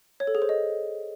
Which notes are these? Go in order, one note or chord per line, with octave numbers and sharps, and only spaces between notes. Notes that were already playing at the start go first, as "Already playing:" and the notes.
C#5
A4
G#4
C5
D#5